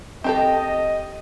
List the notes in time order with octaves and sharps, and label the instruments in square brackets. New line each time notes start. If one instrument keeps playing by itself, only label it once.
[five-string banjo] C4 G4 A4 [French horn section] D#5